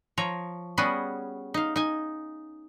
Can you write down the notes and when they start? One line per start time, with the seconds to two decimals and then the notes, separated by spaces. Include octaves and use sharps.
0.18 F3 C#5 A#5
0.77 G3 B3 C#4 F#4 G#4
1.54 D#4 F5
1.76 D#4 G#5